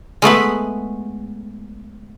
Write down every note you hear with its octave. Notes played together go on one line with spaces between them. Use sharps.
G#3 A3 B3 B4